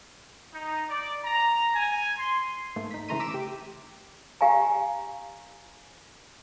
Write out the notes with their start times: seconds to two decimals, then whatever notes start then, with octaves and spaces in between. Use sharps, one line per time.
0.53 D#4
0.89 D5
1.24 A#5
1.75 G#5
2.18 C6
2.76 G#2 A3 A#3
2.91 D#4 B6
3.09 C#3 E3 A3 A#5 C6 D#7
3.20 D6 E6 B6 D7 E7
3.34 G4
4.41 G4 F5 G#5 A#5